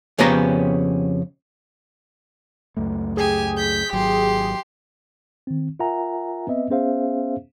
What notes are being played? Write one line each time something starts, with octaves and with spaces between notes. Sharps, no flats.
F2 C#3 B3 C#4 G4 A#5
C#2 F#2 A3
G4 G#4 G#5
G6 B6
G#1 F#3 G4 C6
D#3 C4
F4 A#4 E5 F#5 G#5 A#5
B3 C4 B4 D#5 E5
B3 C#4 G#4 C5 E5 F5